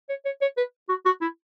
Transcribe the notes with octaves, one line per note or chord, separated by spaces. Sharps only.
C#5
C#5
C#5
B4
F#4
F#4
E4